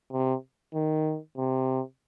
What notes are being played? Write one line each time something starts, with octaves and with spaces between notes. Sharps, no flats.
C3
D#3
C3